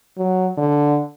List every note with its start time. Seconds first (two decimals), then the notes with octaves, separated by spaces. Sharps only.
0.17 F#3
0.57 D3